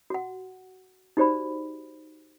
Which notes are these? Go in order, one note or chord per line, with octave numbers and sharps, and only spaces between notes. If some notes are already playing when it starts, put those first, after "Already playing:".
F#4 F#5
D#4 F#4 G4 C5 D5 B5